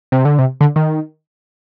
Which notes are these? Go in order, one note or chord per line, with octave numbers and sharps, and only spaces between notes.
C3
D3
C3
D3
D#3